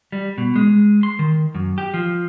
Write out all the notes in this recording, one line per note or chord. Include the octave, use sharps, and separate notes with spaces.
G3
B2
G#3
C6
D#3
F#2
G4
F3